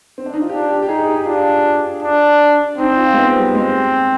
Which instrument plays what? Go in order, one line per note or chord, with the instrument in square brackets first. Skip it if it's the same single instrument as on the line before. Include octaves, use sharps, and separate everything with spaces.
[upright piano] C4
D4
D#4
F4
[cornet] D4 [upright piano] G4
[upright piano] G4
G4
[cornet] D#4 [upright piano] G#4
[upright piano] G4
[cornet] D4 [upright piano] F4
[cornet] D4
[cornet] C4 [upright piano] D#4
[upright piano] F4
G#3
B3
G3
[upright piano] G#3 [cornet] C4